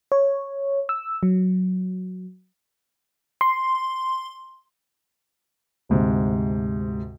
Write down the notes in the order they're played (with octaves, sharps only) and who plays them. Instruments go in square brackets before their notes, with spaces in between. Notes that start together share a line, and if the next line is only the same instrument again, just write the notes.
[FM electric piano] C#5
E6
F#3
C6
[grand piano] D2 G#2 C3